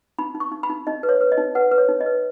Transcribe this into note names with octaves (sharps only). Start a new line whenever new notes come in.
D#4 B5
D#4
C#6
D#4
B5
D#4
D#4 D#5
B4
C#5
B4
D#5
D#4
B4 F#5
B4
C#5
D#4
D#5
B4